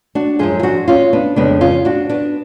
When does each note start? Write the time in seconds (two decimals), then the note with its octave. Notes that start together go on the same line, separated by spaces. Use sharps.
0.15 D4 F#4
0.39 F#2 F3 G#3 F4 G#4
0.60 F4
0.63 D4 F#4
0.88 C#4 F4
1.13 B3 D4
1.36 F2 C#3 G#3 B3 D4
1.61 C#4 F4
1.85 D4 F#4
2.09 B3 D4